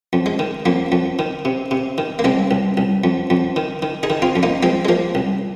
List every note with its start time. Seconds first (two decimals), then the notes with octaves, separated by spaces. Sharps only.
0.13 F2
0.26 G#3
0.39 D#3
0.66 F2 A#3
0.92 F2
1.19 D#3
1.45 C3
1.71 C3
1.98 D#3
2.19 A#3
2.24 C2 G#3 C4
2.51 C2
2.77 C2
3.04 F2
3.30 F2
3.56 D#3
3.82 D#3
4.03 D#4 G#4
4.10 D#3
4.22 C4 F4
4.36 F2
4.43 A#3 D#4
4.63 F3 G#3 C4
4.85 G#3
4.89 F3 A#3
5.15 C2